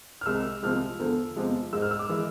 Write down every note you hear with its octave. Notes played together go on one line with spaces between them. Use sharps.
F6
C2 C3 G#3 E6
C2 C3 F3 G#3 F6
E2 D3 F3
E2 C3 F3 G#3
G#2 G#3 E6
F6
E6
D6
E3 G#3